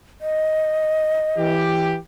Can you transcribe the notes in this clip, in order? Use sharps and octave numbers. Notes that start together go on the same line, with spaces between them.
D#5
E3 G4